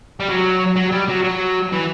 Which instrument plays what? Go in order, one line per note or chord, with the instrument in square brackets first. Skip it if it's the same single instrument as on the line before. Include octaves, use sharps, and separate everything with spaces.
[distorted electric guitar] G3
F#3
F#3
G3
F#3
F#3
E3